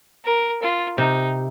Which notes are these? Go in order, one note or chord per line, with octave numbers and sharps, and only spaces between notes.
A#4
F4
C3 D#4